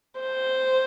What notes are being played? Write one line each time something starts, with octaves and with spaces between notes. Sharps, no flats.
C5